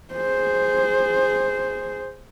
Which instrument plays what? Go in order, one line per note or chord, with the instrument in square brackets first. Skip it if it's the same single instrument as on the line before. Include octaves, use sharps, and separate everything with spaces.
[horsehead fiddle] G#4 C5